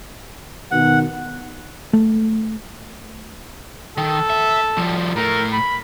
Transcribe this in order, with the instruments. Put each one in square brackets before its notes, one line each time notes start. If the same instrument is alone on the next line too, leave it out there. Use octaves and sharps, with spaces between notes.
[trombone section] B2 D#3 [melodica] F#5
[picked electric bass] A3
[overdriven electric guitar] D#3 [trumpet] A4
[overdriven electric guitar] E5
F3 G3
[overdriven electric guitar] A2 A3 [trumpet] A#4
[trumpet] B5